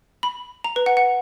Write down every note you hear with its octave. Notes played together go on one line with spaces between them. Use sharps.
B5
A#5
B4
F#5
F#5